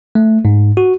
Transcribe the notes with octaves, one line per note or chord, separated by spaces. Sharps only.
A3
G#2
F#4